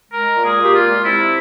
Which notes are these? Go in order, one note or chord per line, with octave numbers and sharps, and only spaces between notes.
G#3 A#4
A#2
G#4
A#2
G4
F4
G#3
C3 E4